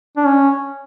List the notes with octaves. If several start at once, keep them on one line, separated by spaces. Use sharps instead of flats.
D4
C#4